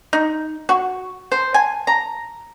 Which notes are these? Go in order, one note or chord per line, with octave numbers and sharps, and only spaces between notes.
D#4
F#4
C5
G#5
A#5